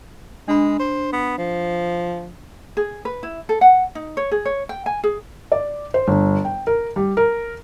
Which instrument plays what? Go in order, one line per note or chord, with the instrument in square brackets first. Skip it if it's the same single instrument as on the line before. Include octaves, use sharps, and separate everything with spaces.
[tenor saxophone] G#3 [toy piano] D4 B5
[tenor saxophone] C5
B3
F3
[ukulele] G#4
B4
E4
A4
F#5
D#4
C#5
G#4
C#5
G5
G#5
G#4
[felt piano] D5
C5
G1
G5
A#4
G3
A#4